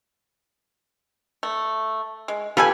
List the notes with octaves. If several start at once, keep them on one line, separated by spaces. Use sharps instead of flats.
A3
G#3
F4 G4 A4 B4 G#5